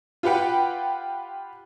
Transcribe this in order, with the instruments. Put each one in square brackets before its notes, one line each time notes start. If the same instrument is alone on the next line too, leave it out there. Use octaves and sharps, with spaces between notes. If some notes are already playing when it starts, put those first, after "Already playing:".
[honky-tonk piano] F4 G4 B4 F#5 G5